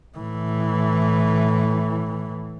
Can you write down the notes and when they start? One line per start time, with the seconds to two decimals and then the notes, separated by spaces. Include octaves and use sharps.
0.18 A2 E3